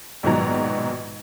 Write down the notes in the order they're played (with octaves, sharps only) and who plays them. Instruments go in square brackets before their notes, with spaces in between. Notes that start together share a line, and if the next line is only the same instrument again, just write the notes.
[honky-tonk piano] A#1 G#2 B2 D#3 F#3 A#5